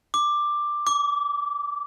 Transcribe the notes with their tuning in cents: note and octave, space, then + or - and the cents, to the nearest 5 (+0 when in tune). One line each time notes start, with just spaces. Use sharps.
D6 +10
D6 -25